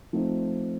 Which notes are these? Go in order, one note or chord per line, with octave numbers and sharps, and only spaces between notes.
F3 A3 C4 D#4